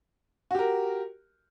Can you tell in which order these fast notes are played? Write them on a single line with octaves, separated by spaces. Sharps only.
F#4 G4 A#4